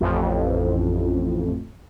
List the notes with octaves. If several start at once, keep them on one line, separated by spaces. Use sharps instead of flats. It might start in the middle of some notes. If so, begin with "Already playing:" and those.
A1 F2